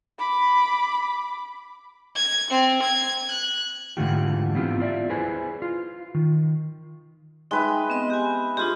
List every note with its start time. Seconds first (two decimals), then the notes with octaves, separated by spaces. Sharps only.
0.19 B5 D6
2.16 G#6
2.50 C4
2.82 G#6
3.31 F#6
3.97 G#2 D3 E3 A3 F4 G4
4.55 B3 C4 E4 F4 G4
4.80 F4 D5 E5
5.10 E4 G#4 B4 C5 G#5
5.62 F4
6.15 D#3
7.51 G#3 D#4 B4 E5 G5
7.90 B3 C4 D#5
8.10 G4 G#5
8.57 G#3 D4 F4 G4 G#4